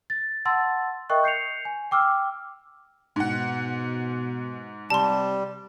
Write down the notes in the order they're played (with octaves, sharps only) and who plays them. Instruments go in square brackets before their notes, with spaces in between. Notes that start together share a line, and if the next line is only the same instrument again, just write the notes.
[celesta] A6
F#5 A5 C6 E6 A6
A#4 D#5 E5 G5 C#6 F#6
G6 C7 C#7 F7
G#5
G5 D6 E6 F6
[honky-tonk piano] G#2 F#5 [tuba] B2
[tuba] C3 [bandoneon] G3 [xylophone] A5 C6